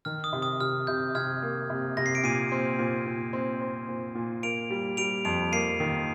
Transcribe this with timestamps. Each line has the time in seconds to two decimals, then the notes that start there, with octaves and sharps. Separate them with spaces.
0.05 D#3 F6
0.24 D#6
0.33 C3
0.42 D#6
0.60 C3 F6
0.87 C3 G6
1.15 C3 F6 G#6
1.42 A#3
1.70 C3
1.97 C3 A#6
2.06 C7
2.15 D7
2.24 A#2 C7 D#7
2.52 C4
2.79 A#2
3.06 A#2
3.33 C4
3.61 C4
3.88 A#2
4.15 A#2
4.43 A#3 D7 F7
4.70 G3
4.97 G3 D7 F7
5.25 F2 D7 F7
5.52 A#3 C7 D#7
5.80 D#3